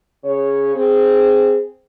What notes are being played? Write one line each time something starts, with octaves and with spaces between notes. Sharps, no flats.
C#3 C#5
C4 G#4